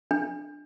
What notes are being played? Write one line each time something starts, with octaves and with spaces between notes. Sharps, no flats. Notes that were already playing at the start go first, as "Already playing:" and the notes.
D4